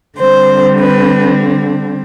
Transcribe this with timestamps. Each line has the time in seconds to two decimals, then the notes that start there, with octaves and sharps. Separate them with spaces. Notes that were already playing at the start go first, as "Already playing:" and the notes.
0.19 D3 G3 C4 C5
0.79 B4